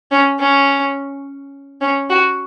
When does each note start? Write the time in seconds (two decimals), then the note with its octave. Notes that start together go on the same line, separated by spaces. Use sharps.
0.11 C#4
0.39 C#4
1.81 C#4
2.10 F#4